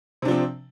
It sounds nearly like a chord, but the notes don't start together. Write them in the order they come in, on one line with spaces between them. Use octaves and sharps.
C3 D4 F3 C4